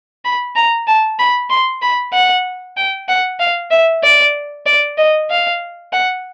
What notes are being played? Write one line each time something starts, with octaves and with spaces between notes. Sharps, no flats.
B5
A#5
A5
B5
C6
B5
F#5
G5
F#5
F5
E5
D5
D5
D#5
F5
F#5